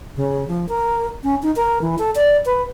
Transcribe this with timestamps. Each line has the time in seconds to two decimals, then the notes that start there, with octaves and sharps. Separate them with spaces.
0.16 C#3
0.48 F3
0.68 A#4
1.23 C#4
1.42 D#4
1.56 A#4
1.81 E3
1.98 A4
2.15 D5
2.45 B4